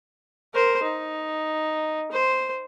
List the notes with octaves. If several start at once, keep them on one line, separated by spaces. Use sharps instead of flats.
A#4 C5
D#4
C5